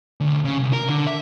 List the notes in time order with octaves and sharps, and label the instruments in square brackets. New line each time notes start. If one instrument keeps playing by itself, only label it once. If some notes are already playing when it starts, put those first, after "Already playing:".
[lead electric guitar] D2
C#3
C2
A#4
D3
E5